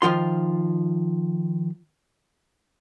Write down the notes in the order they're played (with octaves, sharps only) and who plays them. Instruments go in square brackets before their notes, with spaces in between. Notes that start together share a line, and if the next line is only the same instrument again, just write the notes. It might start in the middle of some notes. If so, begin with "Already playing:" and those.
[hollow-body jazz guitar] D#3 F3 F4 C6